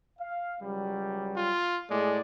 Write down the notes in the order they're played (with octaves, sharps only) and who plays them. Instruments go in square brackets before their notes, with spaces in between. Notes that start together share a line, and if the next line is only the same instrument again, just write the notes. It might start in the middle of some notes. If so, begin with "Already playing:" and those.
[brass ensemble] F5
C#2 F#3 G3
[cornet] F4
[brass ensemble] A2 G#4 D5 [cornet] G#3